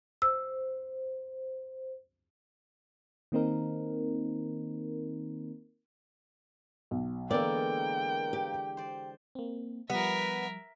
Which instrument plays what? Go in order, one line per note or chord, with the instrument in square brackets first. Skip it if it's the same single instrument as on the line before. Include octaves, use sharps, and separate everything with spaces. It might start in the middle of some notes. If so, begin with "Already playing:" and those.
[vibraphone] C5 [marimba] E6
[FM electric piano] D#3 A#3 C4 D#4 A#4
[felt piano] B1
[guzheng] D3 E3 G#3 [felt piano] A#3 B3 A#4 [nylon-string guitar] D5 [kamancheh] G5
[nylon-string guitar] G4
[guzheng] C5 D5
[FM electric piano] A#3 C4
[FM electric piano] F3 G3 [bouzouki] B3 [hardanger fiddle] A#4 E5